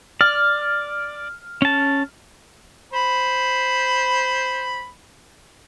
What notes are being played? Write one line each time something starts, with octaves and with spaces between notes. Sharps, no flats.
D5 F6
C#4 A5
C5 B5